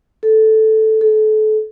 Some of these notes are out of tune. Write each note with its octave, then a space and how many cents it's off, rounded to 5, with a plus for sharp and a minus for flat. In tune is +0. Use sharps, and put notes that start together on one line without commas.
A4 -5
A4 -30